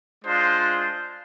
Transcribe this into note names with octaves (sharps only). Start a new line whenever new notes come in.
G#3 D4 F4 C5